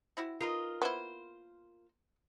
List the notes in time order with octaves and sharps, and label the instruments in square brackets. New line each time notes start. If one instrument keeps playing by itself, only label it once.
[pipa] C4 E4 F#4
[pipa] D#4 B4 D#5 [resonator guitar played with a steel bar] F4 A#4
[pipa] A#3 C5 [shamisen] B3 E4